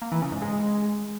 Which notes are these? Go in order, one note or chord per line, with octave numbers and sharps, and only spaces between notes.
A#3
E3
C#3
G#2
G#3